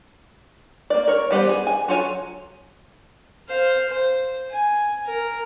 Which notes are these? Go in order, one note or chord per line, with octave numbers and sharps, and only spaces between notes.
A#3 D5
A#4 C#5
E3 G3 B3 C5
G#4
G#5
F#3 F4 A4 C#5 G#5
C5 F5
C5
G#5
A#4